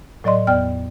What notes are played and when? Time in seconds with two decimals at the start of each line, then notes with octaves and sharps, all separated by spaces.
0.24 A2 F#3 D5 D#5 C6
0.47 E2 B3 D5 G5 F6